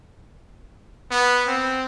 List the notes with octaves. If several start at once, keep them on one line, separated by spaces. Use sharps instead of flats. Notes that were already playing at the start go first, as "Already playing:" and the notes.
B3
C4